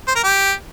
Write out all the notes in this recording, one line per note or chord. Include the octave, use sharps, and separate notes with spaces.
C5
A#4
G4